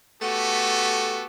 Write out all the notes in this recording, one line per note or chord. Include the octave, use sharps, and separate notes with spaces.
A3 B3 F#4 G4 A4